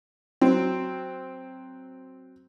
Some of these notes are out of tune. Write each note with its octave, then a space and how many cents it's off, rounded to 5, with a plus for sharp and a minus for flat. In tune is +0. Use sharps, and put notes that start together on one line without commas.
F#3 +0 C4 +0